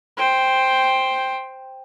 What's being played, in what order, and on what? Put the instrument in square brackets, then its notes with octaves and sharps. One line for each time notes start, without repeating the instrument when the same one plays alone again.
[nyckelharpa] C5 G5